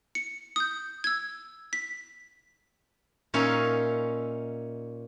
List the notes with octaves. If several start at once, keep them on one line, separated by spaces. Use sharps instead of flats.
C#7
D#6 G6
E6 G#6
B6
A#2 C#4 D#4 C#5 E5 F5